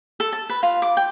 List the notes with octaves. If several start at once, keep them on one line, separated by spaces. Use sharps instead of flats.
A4
A5
B4
F4
D6
G5